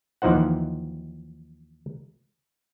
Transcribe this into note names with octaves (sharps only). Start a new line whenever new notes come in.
D#2 E3 F3 D#4 C5 F#5